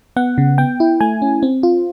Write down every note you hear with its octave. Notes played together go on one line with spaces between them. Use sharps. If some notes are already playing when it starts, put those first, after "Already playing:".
B3 F#5
C#3
B3 G5
E4
A3 G#5
C#4
C4
F4